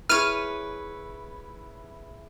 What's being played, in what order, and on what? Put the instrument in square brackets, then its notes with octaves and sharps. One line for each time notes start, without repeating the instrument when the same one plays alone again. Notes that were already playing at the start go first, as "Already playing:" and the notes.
[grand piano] E4 G#4 [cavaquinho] B4 C#5 [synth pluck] F6 D#7